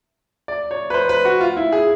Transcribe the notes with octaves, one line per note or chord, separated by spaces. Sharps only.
D5
C#5
B4
C5
B4
F#4
F4
E4
G#4